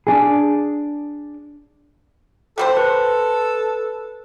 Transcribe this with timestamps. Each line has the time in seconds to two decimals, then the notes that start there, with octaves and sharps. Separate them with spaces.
0.07 D4 G#4
2.58 G3 A3 A4 C5
2.77 B4